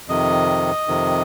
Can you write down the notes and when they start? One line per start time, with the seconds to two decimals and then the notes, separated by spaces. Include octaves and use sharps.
0.08 F2 C3 D#3 D#5
0.88 F2 C3 D#3